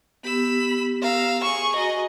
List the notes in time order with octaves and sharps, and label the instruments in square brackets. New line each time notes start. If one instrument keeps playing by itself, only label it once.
[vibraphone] B3 G4 [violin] B5 E6
[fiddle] F5 [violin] A#5 E6
[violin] G#4 [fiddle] C#6
[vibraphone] F#4 A#5 [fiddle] D#5